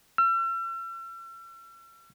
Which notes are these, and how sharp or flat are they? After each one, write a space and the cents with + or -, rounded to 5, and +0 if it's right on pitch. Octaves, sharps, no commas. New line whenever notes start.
E6 +45